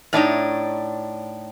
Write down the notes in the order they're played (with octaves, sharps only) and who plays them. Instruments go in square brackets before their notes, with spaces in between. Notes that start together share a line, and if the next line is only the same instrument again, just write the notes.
[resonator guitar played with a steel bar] A2 D4 D#4 C#5